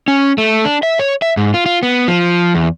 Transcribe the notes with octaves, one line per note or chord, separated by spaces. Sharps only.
C#4
A3
D4
E5
C#5
E5
G#2
F4
F4
B3
F3
E2